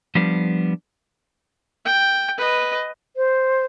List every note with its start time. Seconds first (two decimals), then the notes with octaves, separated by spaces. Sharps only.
0.15 F3 G3 B3 D4
1.85 G5
2.38 B4 D#5
3.17 C5